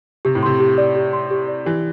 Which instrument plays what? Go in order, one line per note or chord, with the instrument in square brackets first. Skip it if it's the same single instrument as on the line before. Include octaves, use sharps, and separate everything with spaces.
[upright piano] C3 [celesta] G4
[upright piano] A2
[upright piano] C3 [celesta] C6
[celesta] G4
D5
G4
C6
G4
D5
[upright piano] E3 [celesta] G4